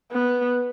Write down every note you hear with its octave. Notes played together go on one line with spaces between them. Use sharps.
B3